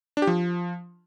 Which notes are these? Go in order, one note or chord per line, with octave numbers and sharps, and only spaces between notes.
D4
G4
F3